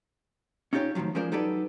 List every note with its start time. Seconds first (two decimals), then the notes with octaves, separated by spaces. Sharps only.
0.73 C#4 D#4 F4 G4 C#5
0.95 A2 C3 D#3 F3 F#3
1.15 F3 G#3 C#4 A#4 C5 D5
1.32 F#3 D#4 G4 A4 B4 D5